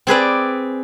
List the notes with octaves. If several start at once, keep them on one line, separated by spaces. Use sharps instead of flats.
C4 G#4 B4 D5